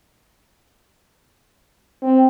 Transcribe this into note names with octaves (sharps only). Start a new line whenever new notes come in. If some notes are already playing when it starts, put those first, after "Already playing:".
C4